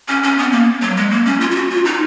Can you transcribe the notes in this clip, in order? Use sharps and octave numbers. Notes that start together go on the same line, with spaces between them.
C#4
C#4
B3
A#3
F#3
G#3
A#3
C#4
F4
F4
F#4
F4
D#4